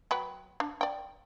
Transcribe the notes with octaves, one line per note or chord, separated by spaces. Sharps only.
F#3 B4 G5
D4
D5 G5